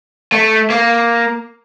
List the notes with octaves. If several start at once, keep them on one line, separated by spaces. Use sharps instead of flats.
A3
A#3